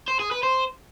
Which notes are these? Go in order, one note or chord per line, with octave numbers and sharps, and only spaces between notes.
C5
G#4
B4
C5